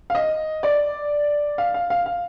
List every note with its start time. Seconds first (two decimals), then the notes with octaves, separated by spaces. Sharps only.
0.10 F5
0.15 D#5
0.63 D5
1.58 F5
1.74 F5
1.90 F5
2.06 F5